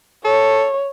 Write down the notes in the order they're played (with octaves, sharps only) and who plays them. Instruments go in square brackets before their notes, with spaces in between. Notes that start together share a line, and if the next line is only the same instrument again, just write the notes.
[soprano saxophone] A4 [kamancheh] C#5